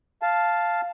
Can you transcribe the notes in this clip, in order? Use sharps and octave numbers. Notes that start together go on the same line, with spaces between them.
F5 A5